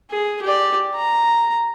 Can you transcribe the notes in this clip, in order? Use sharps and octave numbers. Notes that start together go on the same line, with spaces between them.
G#4
G4 D5
A#5